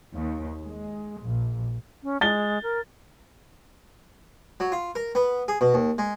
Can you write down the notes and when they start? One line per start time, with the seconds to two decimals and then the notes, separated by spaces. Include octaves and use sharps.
0.14 D#2
0.62 G#3
1.23 A#1
2.03 C#4
2.21 G#3 A6 G7
2.63 A#4
4.60 F#3
4.72 F4
4.95 A#4
5.15 B3
5.48 G#4
5.61 B2
5.74 D#2
5.98 G#3